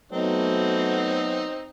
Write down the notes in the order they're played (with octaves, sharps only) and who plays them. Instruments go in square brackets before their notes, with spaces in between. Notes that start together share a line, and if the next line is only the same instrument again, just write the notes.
[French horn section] F#3 A3 B3 [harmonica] C4 D#4